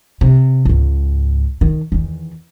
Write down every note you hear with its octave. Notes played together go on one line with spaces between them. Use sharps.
C3
C#2 G#2
D#3
E2 D#3